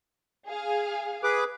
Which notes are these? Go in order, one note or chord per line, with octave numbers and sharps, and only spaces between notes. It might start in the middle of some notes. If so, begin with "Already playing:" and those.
G#4 F5 G#5
G#4 B4 D6